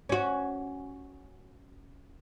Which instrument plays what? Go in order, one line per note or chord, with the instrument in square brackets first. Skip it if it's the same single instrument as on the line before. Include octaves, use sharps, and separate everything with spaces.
[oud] C#4 F#4